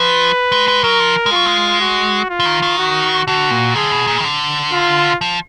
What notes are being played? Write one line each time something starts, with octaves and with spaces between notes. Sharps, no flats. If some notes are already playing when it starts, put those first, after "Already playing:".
Already playing: F3 B4
G#3
G#3
F#3 A#4
F3
G#3
F#3 F4
G#3
F#4
F4
F3
D#3
D#3
F#4
D3 F#4
A#2
D3 G#4
B2
A#2
D#3
D3
F4
F3